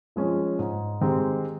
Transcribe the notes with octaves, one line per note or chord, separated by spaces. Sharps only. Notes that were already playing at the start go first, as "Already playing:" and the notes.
F3 G#3 C#4
G#2
D#3 G#3 C4 G4